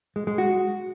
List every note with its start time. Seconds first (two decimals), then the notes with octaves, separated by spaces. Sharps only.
0.16 G#3
0.27 G#3
0.38 F#4